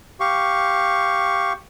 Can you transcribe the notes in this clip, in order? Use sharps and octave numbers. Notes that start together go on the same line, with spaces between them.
G4 F5 C#6